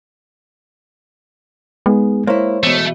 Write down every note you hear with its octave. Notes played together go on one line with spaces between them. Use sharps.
G#3 B3 D#4 G#4
A#3 E4 C5 C#5
E2 B2 A3